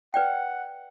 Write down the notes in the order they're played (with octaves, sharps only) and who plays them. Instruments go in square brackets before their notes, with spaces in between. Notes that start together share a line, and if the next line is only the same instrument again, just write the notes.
[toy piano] B4 D5 G5 [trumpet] F#5